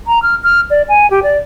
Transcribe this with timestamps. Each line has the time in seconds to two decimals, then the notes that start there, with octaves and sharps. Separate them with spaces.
0.07 A#5
0.23 F6
0.44 F6
0.71 D5
0.89 G#5
1.11 G4
1.23 D5